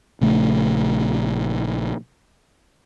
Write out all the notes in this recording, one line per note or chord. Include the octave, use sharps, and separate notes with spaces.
A#1 C#3 A3